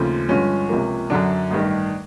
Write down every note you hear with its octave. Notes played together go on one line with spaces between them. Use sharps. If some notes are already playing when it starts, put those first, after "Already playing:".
Already playing: D#2 C#3 F3 A3 C4
G2 D3 F3 G#3 C#4
C#2 C3 F3 A#3
F#2 D3 F#3 D4
A1 G2 D#3